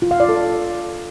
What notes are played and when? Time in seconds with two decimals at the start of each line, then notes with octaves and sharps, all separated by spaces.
0.02 F4
0.11 F5
0.20 D5
0.29 A4